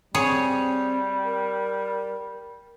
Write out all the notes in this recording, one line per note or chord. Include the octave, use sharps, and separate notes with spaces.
G3 C4 G#4 C#5
A#4